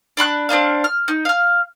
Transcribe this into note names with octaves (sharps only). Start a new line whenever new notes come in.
D4 B5 C6 F#6
C4 D4 D#4 F5
F6
D#4
F5 F6